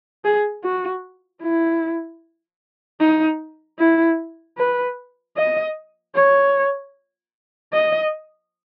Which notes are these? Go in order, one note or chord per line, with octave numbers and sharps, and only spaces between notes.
G#4
F#4
E4
D#4
E4
B4
D#5
C#5
D#5